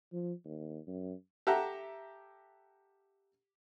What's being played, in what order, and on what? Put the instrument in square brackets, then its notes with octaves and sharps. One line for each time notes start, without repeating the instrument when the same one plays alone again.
[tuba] F3
D#2
F#2
[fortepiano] G4 A4 E5 F#5 A#5